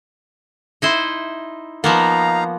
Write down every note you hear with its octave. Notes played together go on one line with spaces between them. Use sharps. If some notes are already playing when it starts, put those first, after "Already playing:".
D#4 E4 C5
F3 A#3 B3 D#4 F5 A#5